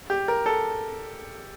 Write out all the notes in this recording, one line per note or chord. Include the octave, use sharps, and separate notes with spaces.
G4
A#4
A4